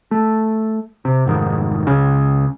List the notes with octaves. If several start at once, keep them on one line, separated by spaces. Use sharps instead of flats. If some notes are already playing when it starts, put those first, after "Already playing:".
A3
C3
F1 G#2 D#3
C#2 C#3